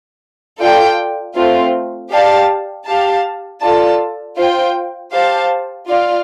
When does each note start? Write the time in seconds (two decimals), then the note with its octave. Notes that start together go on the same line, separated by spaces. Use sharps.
0.61 F4 A4 D5 G5
1.35 A3 C4 F4
2.11 G4 D5 F5 A5
2.87 G4 F5 A5
3.61 F4 A4 D5 A5
4.37 F4 C5 G5
5.13 G4 C5 F5 A5
5.87 F4 D5 F5